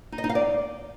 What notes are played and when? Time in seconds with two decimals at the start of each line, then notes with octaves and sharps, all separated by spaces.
0.12 D#4
0.18 D#5
0.24 D#4
0.29 F5
0.35 D5